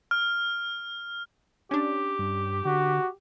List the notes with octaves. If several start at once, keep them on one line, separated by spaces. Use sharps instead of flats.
F6
C#4 D4 G4
G2
D3 F#4